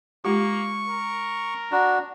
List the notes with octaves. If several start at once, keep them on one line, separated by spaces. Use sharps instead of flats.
G#3 A#3 F4 G4 C#6
A#4
D4 F#4 A#5